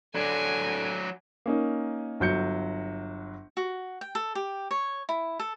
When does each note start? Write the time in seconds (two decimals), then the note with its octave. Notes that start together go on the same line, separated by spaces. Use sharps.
0.15 D3 F#3 D4 G#5
1.46 A#3 C#4 D#4
2.20 G1 F#3 G6 C#7
3.57 F#4
4.01 G5
4.15 A4
4.35 G4
4.71 C#5
5.09 E4
5.39 A4